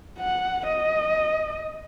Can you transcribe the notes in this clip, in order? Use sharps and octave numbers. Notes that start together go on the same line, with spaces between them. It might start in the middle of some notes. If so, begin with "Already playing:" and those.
F#5
D#5